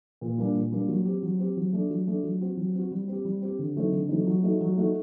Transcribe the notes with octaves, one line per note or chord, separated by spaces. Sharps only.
A#2
G3 A#3 D4
A#2
G3 A#3 D4
F#3
C4 G4
F#3
C4 G4
F#3
A3 D4
F#3
A3 D4
F#3
C4 F#4
F#3
C4 F#4
G3
C4 G4
G3
C4 G4
D3
F#3 A3 C4 D#4
D3
F#3 A3 C4 D#4
F#3
A3 D#4 F#4
F#3
A3 D#4 F#4